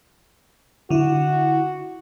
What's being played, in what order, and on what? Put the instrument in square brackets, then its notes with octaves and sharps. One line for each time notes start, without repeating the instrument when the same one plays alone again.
[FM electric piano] D3 E4 [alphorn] F#4